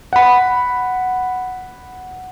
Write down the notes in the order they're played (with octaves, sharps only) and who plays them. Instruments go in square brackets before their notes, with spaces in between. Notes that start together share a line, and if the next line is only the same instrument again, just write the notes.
[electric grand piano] F#5 B5